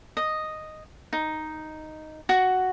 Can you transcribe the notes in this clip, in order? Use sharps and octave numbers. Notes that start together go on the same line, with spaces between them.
D#5
D#4
F#4